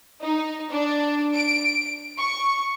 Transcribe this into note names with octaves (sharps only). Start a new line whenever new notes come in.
D#4
D4
D7
C#6